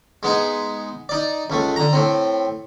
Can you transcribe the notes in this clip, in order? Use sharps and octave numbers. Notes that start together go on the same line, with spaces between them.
G#3 B3 D#4
D#4 D5
C#2 A3
D3 A#5
A2 C4